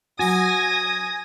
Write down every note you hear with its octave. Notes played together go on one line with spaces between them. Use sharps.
F#3 F#4 G#5 D#6 A#6